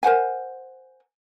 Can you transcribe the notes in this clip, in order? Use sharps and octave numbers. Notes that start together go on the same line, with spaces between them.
A#4 C5 F#5 G#5